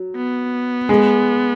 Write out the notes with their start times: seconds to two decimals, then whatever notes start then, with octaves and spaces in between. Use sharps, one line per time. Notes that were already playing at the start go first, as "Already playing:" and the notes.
Already playing: F#3
0.16 B3
0.89 G#3